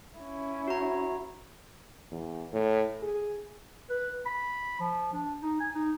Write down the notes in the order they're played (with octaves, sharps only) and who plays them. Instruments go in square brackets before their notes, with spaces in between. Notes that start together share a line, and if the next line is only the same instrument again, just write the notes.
[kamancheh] C#4 E4
[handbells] F#4 A#5
[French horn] E2
A2
G#4
[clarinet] B4
B5
F3
D4
D#4
G#5
D#4